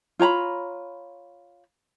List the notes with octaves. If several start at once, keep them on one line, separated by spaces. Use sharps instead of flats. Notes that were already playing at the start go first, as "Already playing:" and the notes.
F4 C#5 A#5 B5